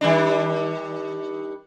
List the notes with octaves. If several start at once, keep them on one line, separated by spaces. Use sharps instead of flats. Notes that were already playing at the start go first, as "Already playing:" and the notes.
D#3 G3 D4